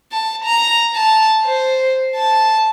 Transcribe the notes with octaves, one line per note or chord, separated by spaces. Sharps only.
A5
A#5
A5
C5
A5